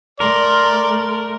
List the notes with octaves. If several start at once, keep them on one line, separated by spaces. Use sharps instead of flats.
A3 A#4 D5 C6